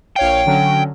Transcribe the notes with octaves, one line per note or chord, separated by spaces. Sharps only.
A#1 C#5 F5 G5
D3 F#3 C#4